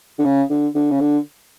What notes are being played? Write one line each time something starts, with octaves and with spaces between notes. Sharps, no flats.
D3
C#3
D3
D3
C#3
D3